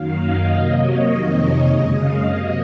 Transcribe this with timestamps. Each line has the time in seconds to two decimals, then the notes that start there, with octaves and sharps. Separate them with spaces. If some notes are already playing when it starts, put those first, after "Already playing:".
Already playing: F#2 D#3 F#3 A#3 F5
0.21 D#5
0.50 C3 F#3 A#3
0.79 C#5
1.09 F2 C3 D#3 A#3 D#5
1.38 C#5
1.67 F#2 C#3 G#3 D#5
1.96 F5
2.25 C3 F#3 A#3 D#5